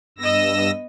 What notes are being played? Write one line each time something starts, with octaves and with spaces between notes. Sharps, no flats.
G2 B3 D#5 E6 A#6